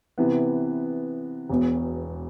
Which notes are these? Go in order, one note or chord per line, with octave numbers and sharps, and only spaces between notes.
C3 E3 B3
E1 E2 B2